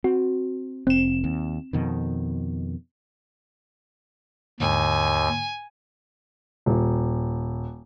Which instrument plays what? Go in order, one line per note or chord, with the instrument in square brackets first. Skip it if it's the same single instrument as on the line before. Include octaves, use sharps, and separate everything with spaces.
[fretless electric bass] C4 [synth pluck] F#4
[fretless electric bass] F1 [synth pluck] C4 E7
[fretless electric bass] D#2
F2 B2 D#3
[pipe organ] D#2 [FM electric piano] G#2 D3 [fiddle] G#5
[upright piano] D#1